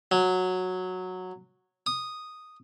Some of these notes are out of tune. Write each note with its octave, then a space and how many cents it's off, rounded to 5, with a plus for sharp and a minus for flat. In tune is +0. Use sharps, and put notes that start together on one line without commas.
F#3 -10
D#6 -5